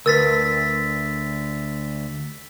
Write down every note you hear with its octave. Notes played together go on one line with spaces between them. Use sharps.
D2 A#4 B4 E6 A6 B6